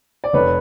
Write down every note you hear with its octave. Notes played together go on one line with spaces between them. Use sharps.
D5
F1 B4 C#5